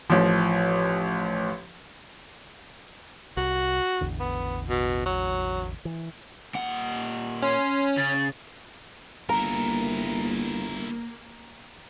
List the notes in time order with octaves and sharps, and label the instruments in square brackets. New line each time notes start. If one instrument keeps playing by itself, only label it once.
[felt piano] A1 F3
[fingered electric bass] C2 [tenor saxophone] F#4
[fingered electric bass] A1 E2 D3
[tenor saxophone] B3
B2
F#3
[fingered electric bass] E3
[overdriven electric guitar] A#2 F#5
[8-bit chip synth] C#4 [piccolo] C6
[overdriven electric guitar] C#3 [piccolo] A6
[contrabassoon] G1 [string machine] A#3 [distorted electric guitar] E4 A#4 [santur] A#5